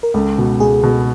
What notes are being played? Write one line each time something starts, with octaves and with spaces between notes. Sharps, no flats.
A#4
C#2 A4
B2
C#2 G#4
B2